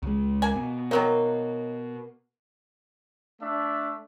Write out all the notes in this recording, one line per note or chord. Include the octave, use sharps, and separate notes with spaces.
C#2 G#3
A#3 G#5
B2
D#3 F#3 A#3 D#4
A3 D4 E5